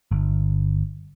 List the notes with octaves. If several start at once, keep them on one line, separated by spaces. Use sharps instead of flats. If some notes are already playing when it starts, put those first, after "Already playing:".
G1